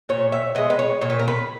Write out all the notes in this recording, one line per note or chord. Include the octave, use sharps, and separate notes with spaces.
A#2 C#5
E5
G#3 B3 D#5
B4
C#5
A#2 C#5
B4
A#4
B4